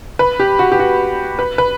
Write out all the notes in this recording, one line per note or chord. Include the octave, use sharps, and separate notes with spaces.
B4
G4
F#4
G4
F#4
B4
B4